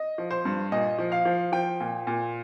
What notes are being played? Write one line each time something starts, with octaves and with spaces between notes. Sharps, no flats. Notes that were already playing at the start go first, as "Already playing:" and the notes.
Already playing: D#5
F3
C5
G2
A#2 D#5
F3
F5
F3
F3 G5
A#2
A#2